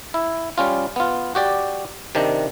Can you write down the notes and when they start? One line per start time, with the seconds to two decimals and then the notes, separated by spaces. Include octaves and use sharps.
0.14 E4
0.58 G3 C#4 F4
0.96 B3 F4
1.35 F#4 G4 D5
2.15 C3 D#3 D4